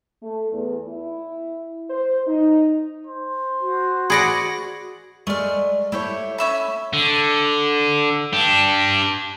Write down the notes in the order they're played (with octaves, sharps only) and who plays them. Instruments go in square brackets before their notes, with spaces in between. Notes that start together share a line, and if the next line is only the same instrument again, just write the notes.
[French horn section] A3
E2
E4
C5
D#4
[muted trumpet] C5
[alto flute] F#4
[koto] G#4 D5 F#5 [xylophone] B5 A#6
[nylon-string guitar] G#3 A#4 D5 [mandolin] A3 F6
[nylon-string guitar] A3 [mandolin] E4 G4 C#5
[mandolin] C#4 E5 B5
[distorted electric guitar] D3
D4 G4